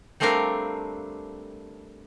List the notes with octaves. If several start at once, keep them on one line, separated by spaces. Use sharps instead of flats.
G3 A3 C4 D4 A#4 F5